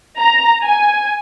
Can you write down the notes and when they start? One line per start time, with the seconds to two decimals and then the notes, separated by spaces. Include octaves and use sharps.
0.19 A#5
0.65 G#5